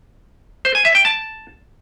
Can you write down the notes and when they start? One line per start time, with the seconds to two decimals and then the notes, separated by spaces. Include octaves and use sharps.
0.65 C5
0.75 G#5
0.85 E5
0.95 G5
1.05 A5